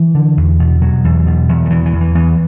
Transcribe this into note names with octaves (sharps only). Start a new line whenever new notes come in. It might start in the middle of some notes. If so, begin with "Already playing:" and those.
Already playing: E3
D3
E2
B2
B2 F#3
E2
B2
E2
D3
E2 E3
E3
E2
E3
E2 E3